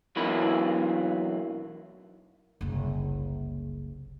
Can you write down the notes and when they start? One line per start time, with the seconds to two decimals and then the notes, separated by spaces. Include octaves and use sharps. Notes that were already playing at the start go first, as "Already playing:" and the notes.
0.16 B1 B2 E3 A#3 B5
2.61 F#1 C2